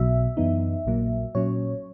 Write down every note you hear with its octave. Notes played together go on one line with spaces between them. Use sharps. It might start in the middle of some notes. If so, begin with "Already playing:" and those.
Already playing: B1 B2 F#3 E5
F#2 E3 B3 D#4
A#1 A#2 F#3 A#3
A#2 F#3 C#4 C#5